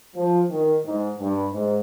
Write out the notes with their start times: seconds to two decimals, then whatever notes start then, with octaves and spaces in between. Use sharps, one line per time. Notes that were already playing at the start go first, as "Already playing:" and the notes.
0.15 F3
0.50 D#3
0.85 G#2
1.19 G2
1.53 G#2